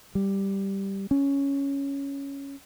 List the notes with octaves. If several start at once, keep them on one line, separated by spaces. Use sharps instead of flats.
G3
C#4